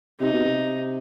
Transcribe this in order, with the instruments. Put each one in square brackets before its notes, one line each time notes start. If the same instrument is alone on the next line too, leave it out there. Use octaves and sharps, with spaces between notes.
[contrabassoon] C3 [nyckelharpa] D#4
[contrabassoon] B2
C3